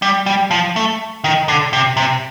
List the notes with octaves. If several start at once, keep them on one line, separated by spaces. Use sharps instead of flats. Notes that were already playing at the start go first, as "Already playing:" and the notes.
G3
G3
F3
A3
D#3
D3
C3
C3